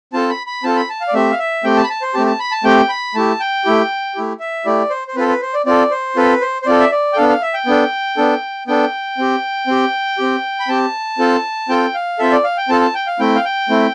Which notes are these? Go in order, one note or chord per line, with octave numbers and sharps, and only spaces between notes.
C4 F4 A4 A5
B5
B5
C4 F4 A4 A5
B5
A5
F5
D5
A3 C4 G4 E5
F5
E5
A3 C4 G4 G5
A5
B5
A5
C5
A3 C4 G4 A5
A5
B5
A5
A3 C4 G4 G5
B5
A3 E4 G4 A5
G5
A3 E4 G4
A3 E4 G4
E5
A3 E4 G4 D5
C5
C5
C4 F4 A4 B4
B4
C5
D5
C4 F4 A4 D5
C5
C4 F4 A4 B4
C5
C5
C4 F4 A4 D5
E5
D5
G5
B3 D4 A4 F5
F5
E5
G5
B3 D4 A4
B3 D4 A4
B3 D4 A4 G5
C4 G4
C4 G4
C4 G4
B5
C4 G4 A5
C4 F4 A4
C4 F4 A4 G5
F5
C4 F4 A4 E5
D5
F5
G5
C4 F4 A4 A5
A5
G5
F5
A3 C4 E4 G5
F5
G5
A3 C4 E4